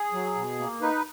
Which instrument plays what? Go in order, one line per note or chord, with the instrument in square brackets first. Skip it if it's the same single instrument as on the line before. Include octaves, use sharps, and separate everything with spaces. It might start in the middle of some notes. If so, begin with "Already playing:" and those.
Already playing: [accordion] G#4
F#3
B2
A#3
D#4 B4